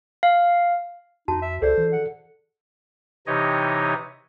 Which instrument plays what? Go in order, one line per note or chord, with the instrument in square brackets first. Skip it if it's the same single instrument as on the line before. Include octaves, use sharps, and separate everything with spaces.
[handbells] F5
[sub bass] F2 [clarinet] D#4 [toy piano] F#4 A5
[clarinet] E5
[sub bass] C#2 [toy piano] G#4 D5 [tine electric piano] A4 [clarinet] C5
[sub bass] E3
[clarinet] F#5
[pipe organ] C3 E3 D#4 G4 C#5 D#5